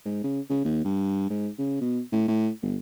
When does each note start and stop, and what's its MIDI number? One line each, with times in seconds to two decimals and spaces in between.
0.05 0.21 44
0.24 0.40 49
0.49 0.60 49
0.65 0.83 39
0.84 1.28 43
1.30 1.48 44
1.59 1.77 49
1.81 2.00 47
2.12 2.24 45
2.28 2.50 45
2.62 2.77 31